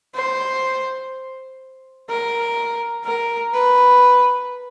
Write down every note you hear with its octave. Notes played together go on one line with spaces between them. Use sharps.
C5
A#4
A#4
B4